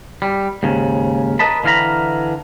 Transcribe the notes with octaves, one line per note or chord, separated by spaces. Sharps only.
G3
D#2 G#2 C#3
A#4 B4 D#5 A5 B5
D3 E3 F5 G5 A#5 B5